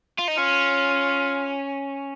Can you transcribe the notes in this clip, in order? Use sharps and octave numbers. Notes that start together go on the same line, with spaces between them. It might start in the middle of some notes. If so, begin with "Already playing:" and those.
F4
D#4
C#4 F4